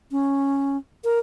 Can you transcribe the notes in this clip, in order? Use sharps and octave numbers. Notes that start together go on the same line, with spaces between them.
C#4
A#4